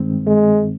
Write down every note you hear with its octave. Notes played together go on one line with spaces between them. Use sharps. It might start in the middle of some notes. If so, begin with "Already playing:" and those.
Already playing: G2 D#3 G#3 C4
G#3